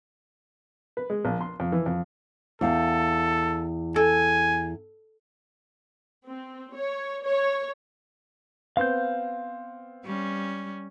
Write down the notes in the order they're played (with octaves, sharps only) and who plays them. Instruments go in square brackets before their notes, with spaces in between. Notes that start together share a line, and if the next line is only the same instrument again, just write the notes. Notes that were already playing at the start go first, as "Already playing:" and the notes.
[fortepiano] B4
G#3
A#1
C6
F2
E3
F2
[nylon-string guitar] E2 F5 G5 [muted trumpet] A4
[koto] A4 [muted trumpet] G#5
[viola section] C4
C#5
C#5
[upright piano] B3 C4 [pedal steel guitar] F5 G6
[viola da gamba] G3 C#4